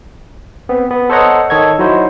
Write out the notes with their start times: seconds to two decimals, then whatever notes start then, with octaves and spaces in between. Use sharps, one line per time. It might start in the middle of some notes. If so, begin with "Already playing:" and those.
0.69 B3 C4
0.91 B3
1.10 A4 C5 C#5 D#5 F#5 A#5
1.50 D#3 A4 C#5 D#5 G#6
1.79 F#3 D#4 E4 F#4 C5